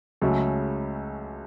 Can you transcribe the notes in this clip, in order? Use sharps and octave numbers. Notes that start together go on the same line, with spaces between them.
C#2 C#3 F#3 A3